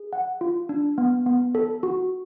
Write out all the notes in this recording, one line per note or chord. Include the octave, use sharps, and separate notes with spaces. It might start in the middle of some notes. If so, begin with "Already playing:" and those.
Already playing: G#4
F#5
F4
D4
B3
B3
A4
F#4